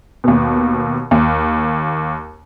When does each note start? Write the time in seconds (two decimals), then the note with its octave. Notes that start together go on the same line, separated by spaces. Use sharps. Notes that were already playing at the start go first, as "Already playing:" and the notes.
0.24 D#2 B2
1.11 D#2